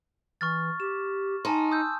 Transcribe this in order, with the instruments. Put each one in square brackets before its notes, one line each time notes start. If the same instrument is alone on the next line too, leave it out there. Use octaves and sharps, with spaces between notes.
[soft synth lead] E3 [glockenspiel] C#6 F6 A6
[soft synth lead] G4 [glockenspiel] E7
[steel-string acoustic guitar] D#4 [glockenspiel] G#5 A5 C6
[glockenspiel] D#6 G6 [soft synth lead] E6